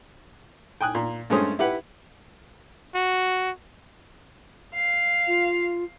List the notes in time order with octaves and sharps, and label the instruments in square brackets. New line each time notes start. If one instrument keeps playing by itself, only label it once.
[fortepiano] G5 G#5 D#6 F#6
A#2
G2 G#3 A3 C#4 C5 D#6
E4 G4 B4 F#5
[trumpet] F#4
[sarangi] F5
[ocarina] F4